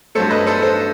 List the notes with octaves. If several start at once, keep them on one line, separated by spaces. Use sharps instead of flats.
G2 F#3 A3 A4 C5
B4 D#5
A4 C5
A4 C5